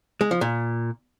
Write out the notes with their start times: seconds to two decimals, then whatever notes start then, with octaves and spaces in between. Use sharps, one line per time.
0.21 G#3
0.31 F3
0.41 A#2